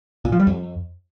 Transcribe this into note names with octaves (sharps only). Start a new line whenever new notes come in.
A#2
F3
G3
F2